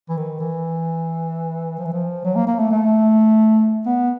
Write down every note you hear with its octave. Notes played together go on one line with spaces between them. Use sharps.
E3
D#3
E3
F3
E3
F3
F#3
A#3
A#3
A3
A3
B3